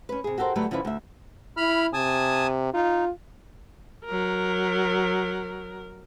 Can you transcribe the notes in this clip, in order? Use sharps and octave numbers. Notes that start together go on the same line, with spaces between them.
C#4 B4
C3 G#4
F#4 G4 A4 A#4 C5
D3 F#3 G3 A3 A4 B4
D3 F3 C#4 E4 B4
D2 E5
E4 B5 F6
C3 G#5 A5 D#6
D#4 F4
F#3 A#4